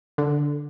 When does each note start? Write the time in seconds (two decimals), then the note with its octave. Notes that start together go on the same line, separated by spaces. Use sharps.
0.18 D3